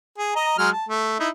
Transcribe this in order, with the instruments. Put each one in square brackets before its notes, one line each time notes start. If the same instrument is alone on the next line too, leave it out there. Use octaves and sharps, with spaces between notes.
[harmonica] G#4
D#5 A#5
F#3 G#3 F6
A5
A3
D#4 E4 E5